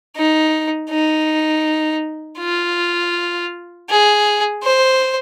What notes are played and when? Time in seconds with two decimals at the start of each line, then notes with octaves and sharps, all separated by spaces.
0.16 D#4
0.91 D#4
2.40 F4
3.90 G#4
4.63 C5